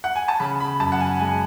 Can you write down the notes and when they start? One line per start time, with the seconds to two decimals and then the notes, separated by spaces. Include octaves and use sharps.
0.04 F#5
0.16 G#5
0.28 A5
0.40 C#3 B5
0.60 B5
0.80 F#2 A5
0.92 F#5
1.01 G#5
1.20 G#3 G#5